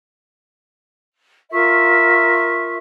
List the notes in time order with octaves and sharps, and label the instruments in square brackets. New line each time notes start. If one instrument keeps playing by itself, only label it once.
[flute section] F4 A#4 E5 C#6